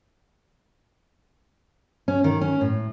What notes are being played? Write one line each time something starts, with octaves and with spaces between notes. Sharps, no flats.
C#4
D#3
C#4
A2